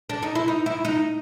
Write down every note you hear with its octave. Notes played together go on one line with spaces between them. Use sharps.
D4
D#4
E4
D#4
E4
D#4